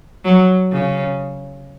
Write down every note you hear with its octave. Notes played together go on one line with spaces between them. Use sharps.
F#3
C#3